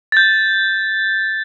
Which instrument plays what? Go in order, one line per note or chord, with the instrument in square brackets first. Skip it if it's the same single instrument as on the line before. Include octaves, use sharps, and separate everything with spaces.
[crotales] G6 A6